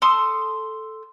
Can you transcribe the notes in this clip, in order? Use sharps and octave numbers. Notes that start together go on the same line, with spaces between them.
A4 C6 D#6